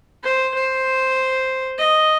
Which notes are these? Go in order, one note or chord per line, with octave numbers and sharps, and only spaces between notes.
C5
C5
D#5